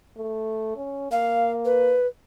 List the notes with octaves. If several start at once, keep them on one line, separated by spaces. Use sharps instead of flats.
A3
C#4
A#3 F5
B4